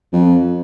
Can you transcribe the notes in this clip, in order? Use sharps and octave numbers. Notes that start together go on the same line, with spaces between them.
F2